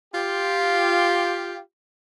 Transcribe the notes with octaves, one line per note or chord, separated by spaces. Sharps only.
F4 G4